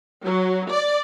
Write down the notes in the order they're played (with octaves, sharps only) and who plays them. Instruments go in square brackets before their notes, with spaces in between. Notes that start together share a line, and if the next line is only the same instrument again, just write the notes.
[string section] F#3
D5